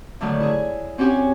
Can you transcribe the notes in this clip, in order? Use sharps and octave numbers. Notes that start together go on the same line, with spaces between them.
A2 D3 D#3 F#3 A3
E4 G#4
C4 C#4 F#4 G4 C#5 G#5